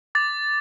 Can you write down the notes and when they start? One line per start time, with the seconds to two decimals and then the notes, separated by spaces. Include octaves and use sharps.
0.15 D6 A6